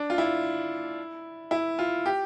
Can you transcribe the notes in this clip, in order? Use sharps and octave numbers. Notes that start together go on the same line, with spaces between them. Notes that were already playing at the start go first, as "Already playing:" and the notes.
Already playing: D4
F4
E4
E4
F4
G4